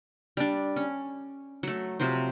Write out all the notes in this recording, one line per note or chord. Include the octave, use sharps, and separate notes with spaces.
G3 D4
C#4
F#3 A3
C3 F3 F#3 C5